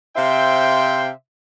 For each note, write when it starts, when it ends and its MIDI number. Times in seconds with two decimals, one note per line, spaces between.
0.17 1.10 48
0.17 1.10 72
0.17 1.10 76
0.17 1.10 77
0.17 1.10 79
0.17 1.10 84